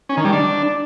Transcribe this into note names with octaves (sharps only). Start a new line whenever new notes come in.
C#4
D#3
G3
D4